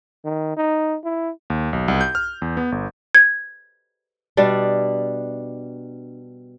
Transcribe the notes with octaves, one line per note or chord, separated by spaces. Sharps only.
D#3
D#4
E4
D#2
B1
C2
G6
F6
E2
B3
G1
G#6
B2 G3 D4